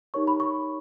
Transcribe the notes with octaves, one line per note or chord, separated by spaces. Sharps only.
D#4 G4 A#4 C#5 C#6
B5
C#6